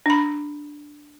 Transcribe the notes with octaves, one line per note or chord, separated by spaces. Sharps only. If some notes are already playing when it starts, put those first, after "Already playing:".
D4 B5